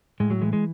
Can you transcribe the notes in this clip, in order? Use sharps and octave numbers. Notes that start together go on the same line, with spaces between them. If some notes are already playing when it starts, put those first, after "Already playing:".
A2 G#3
F#3
E3 G#3
G#3